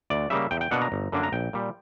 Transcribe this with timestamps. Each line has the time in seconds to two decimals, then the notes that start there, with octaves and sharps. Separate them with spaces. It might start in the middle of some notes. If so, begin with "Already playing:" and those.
0.10 D2 D5
0.30 C#3 G3 A#3 E5
0.51 E2 G5
0.61 G5
0.71 B2 A#3 D4 F#5
0.82 A#5
0.92 G1
1.12 F#2 D3 A#3 D4
1.23 A#5
1.32 A#1 G5
1.53 A#2 G3